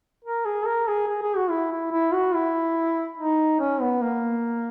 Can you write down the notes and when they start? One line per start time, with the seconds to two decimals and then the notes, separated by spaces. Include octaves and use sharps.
0.25 A#4
0.45 G#4
0.66 A#4
0.88 G#4
1.08 G#4
1.22 G#4
1.36 F#4
1.50 E4
1.71 E4
1.92 E4
2.12 F#4
2.34 E4
3.18 D#4
3.60 C#4
3.81 B3
4.02 A#3